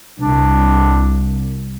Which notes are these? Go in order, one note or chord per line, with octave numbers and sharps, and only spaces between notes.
C2 D4